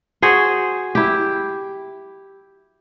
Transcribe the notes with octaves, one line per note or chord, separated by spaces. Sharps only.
F#4 G#4 C5
E4 G4